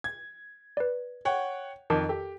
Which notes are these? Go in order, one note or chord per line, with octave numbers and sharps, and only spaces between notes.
G#6
B4 D5
C#5 F#5 G5
F2 D#3 A#4 A5 D6
G4 A4